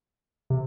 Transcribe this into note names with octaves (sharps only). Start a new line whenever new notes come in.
C3